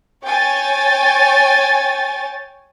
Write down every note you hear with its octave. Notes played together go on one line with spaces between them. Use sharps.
C#5 G5 G#5 A6